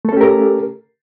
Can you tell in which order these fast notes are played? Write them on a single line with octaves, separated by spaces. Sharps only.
A3 A4 C#4 G4 A#4